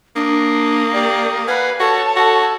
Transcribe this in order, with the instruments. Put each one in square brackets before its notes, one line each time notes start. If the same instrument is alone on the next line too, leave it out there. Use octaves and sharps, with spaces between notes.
[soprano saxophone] A#3 [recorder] D4 [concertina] D#6
[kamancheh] G4 [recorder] D5
[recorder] B4 [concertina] F5 F#5 G#5 [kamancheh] B5
[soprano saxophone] F#4 [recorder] A4 [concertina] C#5 [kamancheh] A5
[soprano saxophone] F#4